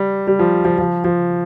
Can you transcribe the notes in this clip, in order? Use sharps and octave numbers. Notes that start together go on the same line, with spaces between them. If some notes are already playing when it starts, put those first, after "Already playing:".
Already playing: G3
G3
F3
F3
F3
F3